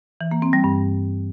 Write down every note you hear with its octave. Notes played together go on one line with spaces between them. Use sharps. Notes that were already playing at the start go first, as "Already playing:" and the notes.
E3
A#3
C4
G3
G2